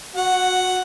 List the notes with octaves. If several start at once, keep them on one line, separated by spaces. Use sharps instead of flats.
F#4 F#5